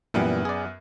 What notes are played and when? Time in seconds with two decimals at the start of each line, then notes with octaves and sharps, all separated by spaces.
0.14 F#2 A#2 E3 G3 B3
0.45 G#4 D5